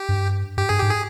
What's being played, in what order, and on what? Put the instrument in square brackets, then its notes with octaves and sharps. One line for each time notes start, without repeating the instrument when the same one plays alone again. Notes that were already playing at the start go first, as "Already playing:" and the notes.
Already playing: [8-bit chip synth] G4
[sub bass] G2
[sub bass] G2 [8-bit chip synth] G4
[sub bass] G2 [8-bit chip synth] G#4
[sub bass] G#2 [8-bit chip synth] G4
[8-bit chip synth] G#4